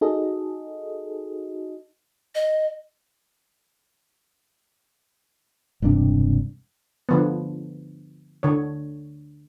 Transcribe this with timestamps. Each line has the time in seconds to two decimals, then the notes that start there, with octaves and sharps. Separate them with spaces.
0.01 D#4 F#4 G#4 A4 D#5
2.35 D#5
5.82 E1 G2 C3 D4
7.09 D3 F3 B3
8.43 D3 C#5